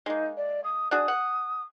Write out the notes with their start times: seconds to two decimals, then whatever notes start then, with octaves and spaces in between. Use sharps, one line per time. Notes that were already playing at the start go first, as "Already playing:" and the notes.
0.06 G#3 A#3 D#4
0.37 D5
0.64 D#6
0.91 D4 F#4 G#4 D#6
1.08 F#5